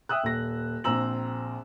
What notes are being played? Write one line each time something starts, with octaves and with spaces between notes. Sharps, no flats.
E5 G5 D#6 E6 F#6
D#1 A#6
A#1 C4 A#5 E6 F#7